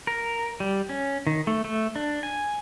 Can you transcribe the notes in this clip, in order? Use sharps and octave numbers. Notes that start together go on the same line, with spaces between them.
A#4
G3
C#4
D#3
A3
A3
D4
G#5